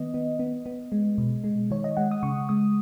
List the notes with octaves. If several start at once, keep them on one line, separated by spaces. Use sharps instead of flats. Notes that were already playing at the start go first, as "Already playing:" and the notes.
Already playing: D#3 B3 D#5
B3
B3
B3
G#3
B2
G#3
D#3 C#5
D#5
G#3 F#5
D#6
C#3 C#6
G#3 D#6